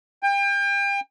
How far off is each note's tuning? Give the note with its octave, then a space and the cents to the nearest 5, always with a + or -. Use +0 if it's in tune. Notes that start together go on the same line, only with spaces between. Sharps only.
G5 +35